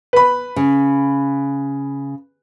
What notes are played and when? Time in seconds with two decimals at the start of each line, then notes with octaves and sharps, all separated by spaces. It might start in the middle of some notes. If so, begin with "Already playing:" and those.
0.13 B4 B5
0.56 C#3